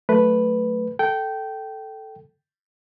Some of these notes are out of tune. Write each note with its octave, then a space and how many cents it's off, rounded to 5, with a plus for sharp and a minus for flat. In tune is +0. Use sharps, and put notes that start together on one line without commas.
F#3 +0 A3 +0 B4 +0
A4 +0 G5 -15